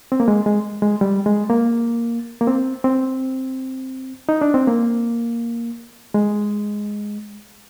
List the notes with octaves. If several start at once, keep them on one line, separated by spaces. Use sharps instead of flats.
C4
A#3
G#3
G#3
G#3
G3
G#3
A#3
A#3
C4
C4
D#4
D4
C4
A#3
G#3